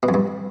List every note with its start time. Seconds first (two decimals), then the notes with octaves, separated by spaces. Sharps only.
0.03 B2
0.09 F2
0.14 G2